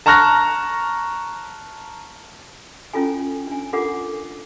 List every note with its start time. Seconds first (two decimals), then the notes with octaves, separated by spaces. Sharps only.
0.06 A5 A#5 C#6 F6 F#6 A#6
2.93 C#4 E4 F4 A4 G#5
3.47 D4 G#5
3.73 D4 F4 A4 A#4 F#5 D6